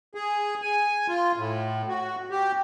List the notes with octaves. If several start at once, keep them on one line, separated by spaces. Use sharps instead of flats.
G#4
G#5
F4
A2
F#4
G4